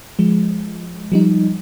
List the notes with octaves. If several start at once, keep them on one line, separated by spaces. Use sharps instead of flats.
F3 G#3
F3 G3 D#4